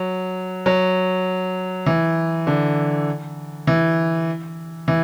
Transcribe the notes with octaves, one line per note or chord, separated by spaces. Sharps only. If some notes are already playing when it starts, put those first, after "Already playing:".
Already playing: F#3
F#3
E3
D3
E3
E3